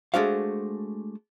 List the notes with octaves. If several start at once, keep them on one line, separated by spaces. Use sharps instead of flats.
G#3 A3 D4 F#4 C5 F5